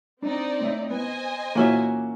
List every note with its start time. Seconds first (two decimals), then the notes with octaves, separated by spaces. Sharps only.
0.22 C4 D4 D#4 D5
0.60 A2 E5
0.90 B3 C5 D#5 G#5
1.55 A#2 E3 A#3 C#4 F#4 E5